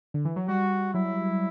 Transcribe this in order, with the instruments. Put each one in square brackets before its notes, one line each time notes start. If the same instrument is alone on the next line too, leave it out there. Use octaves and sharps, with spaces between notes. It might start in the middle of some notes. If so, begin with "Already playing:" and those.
[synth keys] D3
E3
F#3
[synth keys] G3 [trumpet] F#4
[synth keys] F#3 [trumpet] E4